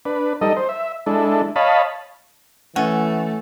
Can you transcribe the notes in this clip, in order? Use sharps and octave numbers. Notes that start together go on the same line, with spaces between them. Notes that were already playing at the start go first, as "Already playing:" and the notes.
D4 B4
G3 D#4 A4 D#5
C5
E5
G#3 D4 E4 A4
C#5 D#5 F5 A5 B5
E3 A3 C#4 F#5